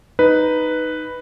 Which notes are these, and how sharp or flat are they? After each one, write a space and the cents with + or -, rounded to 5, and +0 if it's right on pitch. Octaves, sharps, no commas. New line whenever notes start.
D#4 +0 B4 +0